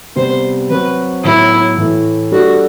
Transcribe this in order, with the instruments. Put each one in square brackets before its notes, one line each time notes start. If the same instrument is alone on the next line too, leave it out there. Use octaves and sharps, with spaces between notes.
[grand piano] C3 G3 B3 [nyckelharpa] C5
[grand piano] F#3 C4 F#4 [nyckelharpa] B4
[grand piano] A2 F#3 B3 [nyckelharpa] E4
[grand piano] A2 E3 A3 E4
[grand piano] G3 D4 A4 [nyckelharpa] F#4